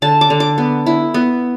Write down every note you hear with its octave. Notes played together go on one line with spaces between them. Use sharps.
D3 A5
D6
D3
D6
B3
E4
B3